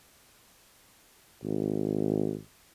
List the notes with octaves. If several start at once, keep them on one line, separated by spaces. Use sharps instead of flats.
G#1